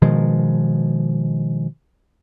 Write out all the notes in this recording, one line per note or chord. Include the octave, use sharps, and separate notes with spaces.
B2 D#3 F3 G#3